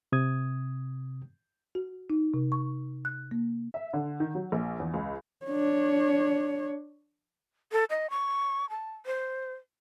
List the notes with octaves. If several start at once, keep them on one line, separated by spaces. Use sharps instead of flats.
C3 D#6 G#6
F#4
D#4
C3
C#6
F#6
A#3
E5
D3
D#3
F#3
A#1
E2
C#2
D4 C#5
A4
D#5
C#6
A5
C5